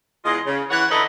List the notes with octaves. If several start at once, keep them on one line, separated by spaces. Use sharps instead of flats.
E2 G#3 F4 D#5
C#3
E3 C#5 F#5
D3 D#4 E4 A4 B4 D#5